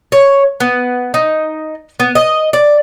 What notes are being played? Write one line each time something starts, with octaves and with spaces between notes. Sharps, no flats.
C#5
B3
D#4
B3
D#5
D5